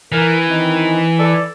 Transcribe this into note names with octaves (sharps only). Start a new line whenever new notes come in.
E3 A#4
D#3 C4
A4 D5